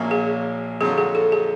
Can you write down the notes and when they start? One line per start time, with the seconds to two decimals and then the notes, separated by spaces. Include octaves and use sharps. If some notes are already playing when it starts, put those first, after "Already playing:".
Already playing: A#1 A#2 F#3 A#3 C#4
0.11 G#4
0.81 F2 D3 F#3 G#4
0.98 G#4
1.15 A4
1.32 G#4